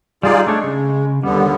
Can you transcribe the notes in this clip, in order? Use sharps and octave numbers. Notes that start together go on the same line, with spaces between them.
G3 D#4 F4 G#4 D5
G#3 A3 D4 C#5
C#3
D#2 D3 G3 B3